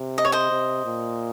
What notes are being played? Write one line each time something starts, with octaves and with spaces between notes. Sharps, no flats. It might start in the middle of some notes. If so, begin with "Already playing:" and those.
Already playing: C3
D#5
C#5
C5 D#5
C3
A#2